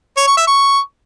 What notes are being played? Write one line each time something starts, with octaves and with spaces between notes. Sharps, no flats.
C#5
C#6
E5
C#6